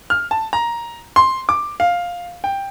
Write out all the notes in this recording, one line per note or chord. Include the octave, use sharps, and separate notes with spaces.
F6
A5
A#5
C6
D6
F5
G5